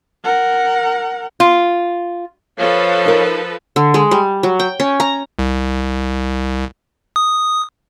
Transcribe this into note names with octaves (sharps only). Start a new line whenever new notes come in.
A#4 F#5
F4
F3 A4 B4 C#5 F5
D#4 A#4
D3
G#3
G3
F#3
G5
C#4
A#5
C2
D#6